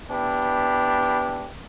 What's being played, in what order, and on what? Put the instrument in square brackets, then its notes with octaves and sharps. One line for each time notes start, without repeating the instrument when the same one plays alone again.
[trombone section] B3 D4 E4 G4